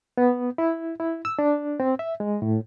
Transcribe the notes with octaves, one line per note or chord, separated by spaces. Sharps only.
B3
E4
E4
E6
D4
C4
E5
G#3
A2